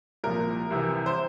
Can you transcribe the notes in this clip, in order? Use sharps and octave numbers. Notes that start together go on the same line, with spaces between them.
C2 A#2 F3 A#4
C2 C3 E3
C5